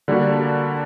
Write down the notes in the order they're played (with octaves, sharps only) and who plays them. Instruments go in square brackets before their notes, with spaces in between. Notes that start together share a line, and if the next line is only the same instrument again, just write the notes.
[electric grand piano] D3 G3 A#3 D4 F#4